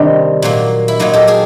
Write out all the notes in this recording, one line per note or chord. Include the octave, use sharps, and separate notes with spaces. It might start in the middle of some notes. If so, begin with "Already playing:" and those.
Already playing: C3 D#3 G3 D4
A#2 F#3 A#3
E4
A#2 F#3 A#3 D#4
G4 A4
G#4 A#4